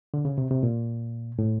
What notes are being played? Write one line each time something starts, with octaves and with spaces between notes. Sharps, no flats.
D3
C#3
C3
C3
A#2
A2